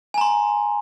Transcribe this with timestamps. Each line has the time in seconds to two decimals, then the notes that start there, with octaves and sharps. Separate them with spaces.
0.14 G#5
0.18 A#5
0.21 C6